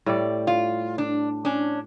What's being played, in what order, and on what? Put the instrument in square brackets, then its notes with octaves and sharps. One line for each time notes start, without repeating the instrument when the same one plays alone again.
[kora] A2 G3 D5
[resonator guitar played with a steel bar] F4
D4
C#4 D4